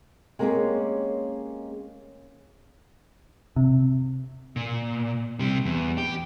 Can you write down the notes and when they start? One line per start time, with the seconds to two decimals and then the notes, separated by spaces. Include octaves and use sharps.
0.39 G#3 A#3 C4 C#4 G4 G#4
3.56 C3
4.56 A#2
5.39 C3 G3
5.66 E2
5.98 G4